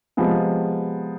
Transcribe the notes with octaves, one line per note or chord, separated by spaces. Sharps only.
C3 F3 G#3 B3